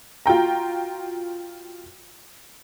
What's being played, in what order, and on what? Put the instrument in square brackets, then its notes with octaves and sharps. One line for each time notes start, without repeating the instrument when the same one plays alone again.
[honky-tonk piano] F4 F#4 G5 A#5